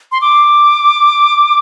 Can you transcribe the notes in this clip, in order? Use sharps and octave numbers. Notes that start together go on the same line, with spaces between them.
C6
D6